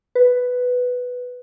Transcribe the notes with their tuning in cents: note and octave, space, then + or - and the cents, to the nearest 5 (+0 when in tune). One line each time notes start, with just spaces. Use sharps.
B4 +5